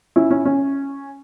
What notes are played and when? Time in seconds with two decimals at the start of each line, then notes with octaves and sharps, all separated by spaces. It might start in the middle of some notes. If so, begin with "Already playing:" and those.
0.16 C#4 E4
0.30 C#4 E4
0.45 C#4